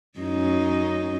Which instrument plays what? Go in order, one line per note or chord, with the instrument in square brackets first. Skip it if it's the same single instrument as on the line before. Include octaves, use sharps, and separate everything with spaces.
[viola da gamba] F#2 C#4 D#4